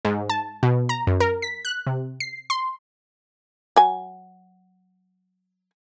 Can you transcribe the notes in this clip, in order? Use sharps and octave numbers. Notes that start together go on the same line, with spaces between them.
G#2
A5
B2
A#5
F#2
A#4
B6
F#6
C3
C7
C6
F#3 G#5